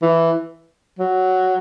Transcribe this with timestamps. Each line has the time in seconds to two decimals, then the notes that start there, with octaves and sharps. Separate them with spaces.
0.02 E3
0.99 F#3